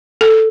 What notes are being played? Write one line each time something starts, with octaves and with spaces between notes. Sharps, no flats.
A4